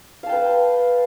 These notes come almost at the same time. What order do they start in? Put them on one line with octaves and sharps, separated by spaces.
F5 A5 G5 B4